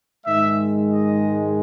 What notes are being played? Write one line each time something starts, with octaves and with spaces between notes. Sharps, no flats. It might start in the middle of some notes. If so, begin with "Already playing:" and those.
G#2 D#3 G#3 E5
D#5